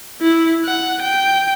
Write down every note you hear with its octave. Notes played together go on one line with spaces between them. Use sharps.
E4
F#5
G5